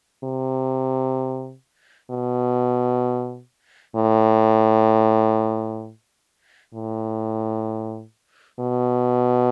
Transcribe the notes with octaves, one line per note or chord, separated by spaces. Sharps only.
C3
B2
A2
A2
B2